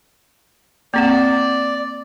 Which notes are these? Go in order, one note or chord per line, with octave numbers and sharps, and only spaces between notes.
A#3 C4 D5 F#5